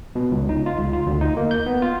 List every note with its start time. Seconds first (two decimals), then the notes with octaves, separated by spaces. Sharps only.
0.15 B2
0.31 C#2
0.49 D#4
0.66 F4
0.78 C#2
0.93 F4
1.06 D2
1.21 D#4
1.37 A#3
1.51 G6
1.66 B3
1.82 F4